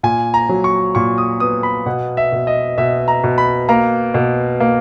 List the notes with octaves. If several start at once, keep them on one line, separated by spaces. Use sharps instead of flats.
A#2 G#5
A#5
F#3
C#6
A#2 C#6
D#6
B3 D#6
B5
B2 F#5
E5
B2
D#5
B2 E5
A#5
B2
B5
A#3 A#5
B2
A#3